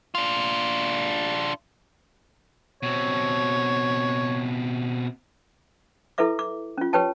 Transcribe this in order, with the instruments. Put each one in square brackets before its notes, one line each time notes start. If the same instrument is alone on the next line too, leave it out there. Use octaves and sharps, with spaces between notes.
[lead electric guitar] D4 F4
[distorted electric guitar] B2 C4 [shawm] C#5
[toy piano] E4 A4 B4 E5 D6
D6
C#4 F4
G4 B4 C#5 G5 A5